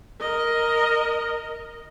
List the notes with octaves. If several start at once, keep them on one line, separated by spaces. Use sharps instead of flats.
A#4 D#5